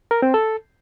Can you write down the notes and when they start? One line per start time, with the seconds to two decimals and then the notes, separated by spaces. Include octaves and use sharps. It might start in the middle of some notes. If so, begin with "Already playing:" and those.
0.11 A#4
0.22 C4
0.34 A4